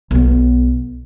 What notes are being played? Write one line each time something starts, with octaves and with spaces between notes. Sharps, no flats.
B1 B3